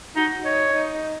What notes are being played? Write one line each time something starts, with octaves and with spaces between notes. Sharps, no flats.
D#4 F#4
D#4 C#5
D#4